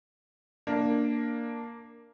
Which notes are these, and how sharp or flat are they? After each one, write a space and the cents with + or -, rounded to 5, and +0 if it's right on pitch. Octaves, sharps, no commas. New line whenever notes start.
A#3 +0 D4 +0